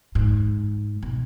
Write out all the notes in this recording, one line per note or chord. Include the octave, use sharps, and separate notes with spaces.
G#2
B2